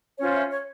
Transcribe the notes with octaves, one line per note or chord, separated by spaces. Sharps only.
C#4 F4 C5 C#5
E5
C#5